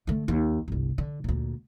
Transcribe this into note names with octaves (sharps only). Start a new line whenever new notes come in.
D3 A3
D#2
G1 C2
D3
D2 A#2